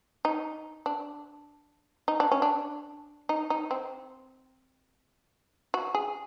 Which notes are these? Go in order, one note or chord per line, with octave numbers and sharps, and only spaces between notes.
D#4
D4
D#4
D4
C#4
D4
D#4
D#4
C4
F#4
G#4